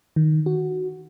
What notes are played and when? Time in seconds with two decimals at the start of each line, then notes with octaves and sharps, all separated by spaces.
0.16 D#3
0.46 F#4